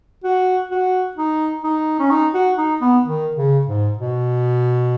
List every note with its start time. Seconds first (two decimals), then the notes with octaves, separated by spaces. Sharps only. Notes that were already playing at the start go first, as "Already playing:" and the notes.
0.24 F#4
0.71 F#4
1.17 D#4
1.64 D#4
2.00 C#4
2.10 D#4
2.34 F#4
2.58 D#4
2.81 B3
3.05 D#3
3.36 C#3
3.67 G#2
3.99 B2